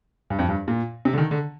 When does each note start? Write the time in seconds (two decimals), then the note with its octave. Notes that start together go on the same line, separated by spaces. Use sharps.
0.30 G2
0.39 F2
0.49 G2
0.68 A#2
1.05 C3
1.13 D3
1.18 D#3
1.31 D3